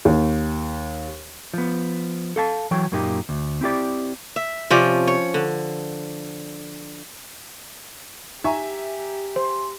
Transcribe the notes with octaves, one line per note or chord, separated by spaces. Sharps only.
D#2
F3 B3
A4 F5 A5
E3 F#3 C#5 G5
F#2 A#2 A#3 D#4 G4
D2
C4 E4 G4 D5
E5
C3 F3 C#4 D5
C#5
D3
D#4 G4 E5 G#5 A#5 C#6
C5 C6